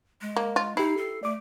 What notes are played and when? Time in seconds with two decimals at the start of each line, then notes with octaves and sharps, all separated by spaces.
0.21 G#3
0.36 A#3
0.56 F4
0.77 D#4 E4 G4 C7
0.97 A4
1.23 A3 D5 D6